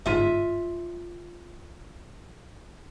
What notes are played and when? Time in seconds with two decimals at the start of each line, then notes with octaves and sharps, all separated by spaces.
0.06 G1 G#2 F4 E5